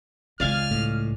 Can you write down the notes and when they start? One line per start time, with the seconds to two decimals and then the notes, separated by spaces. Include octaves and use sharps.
0.40 C#2 D5 F5 G#5 F6
0.71 A2